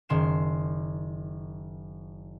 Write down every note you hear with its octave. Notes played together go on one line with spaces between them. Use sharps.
F#1 D#3 C6 C7 E7